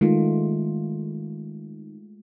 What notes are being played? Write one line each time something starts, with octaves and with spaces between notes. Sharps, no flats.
D#3 G#3 A3 F4